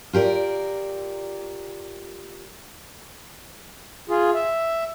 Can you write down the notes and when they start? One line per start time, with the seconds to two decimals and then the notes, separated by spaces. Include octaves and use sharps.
0.13 F4 G4 A#4 D5
4.09 F4 G#4
4.34 E5